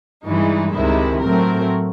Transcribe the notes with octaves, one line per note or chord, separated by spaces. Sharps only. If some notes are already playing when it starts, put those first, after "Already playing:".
G2 E3 G#3 D#4
C#2 C3 D#3 G#3 E4
A2 F#3 A3 C4 A#4